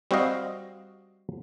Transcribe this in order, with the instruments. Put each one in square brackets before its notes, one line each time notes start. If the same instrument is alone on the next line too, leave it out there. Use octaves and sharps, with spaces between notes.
[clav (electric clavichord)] G3 C4 F#4 C5 D#5 F5